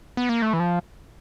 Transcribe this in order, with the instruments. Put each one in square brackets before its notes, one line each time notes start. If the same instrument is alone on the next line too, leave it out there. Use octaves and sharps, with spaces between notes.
[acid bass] B3
A#3
A3
E3
F3